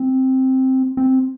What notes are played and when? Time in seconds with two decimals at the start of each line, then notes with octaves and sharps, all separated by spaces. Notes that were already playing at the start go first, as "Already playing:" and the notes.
Already playing: C4
0.97 C4